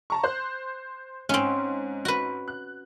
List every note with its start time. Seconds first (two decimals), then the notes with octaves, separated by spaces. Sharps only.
0.10 A5 A#5 C#6
0.23 C5 F#6
1.29 G#2 C4 C#4
2.05 F#4 B4
2.48 F#6